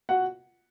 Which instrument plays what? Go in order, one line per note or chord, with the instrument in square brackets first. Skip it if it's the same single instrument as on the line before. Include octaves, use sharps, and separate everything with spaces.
[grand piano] F#4 F#5